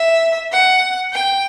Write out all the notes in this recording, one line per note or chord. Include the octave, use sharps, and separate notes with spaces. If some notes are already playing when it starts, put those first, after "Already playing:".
Already playing: E5
F#5
G5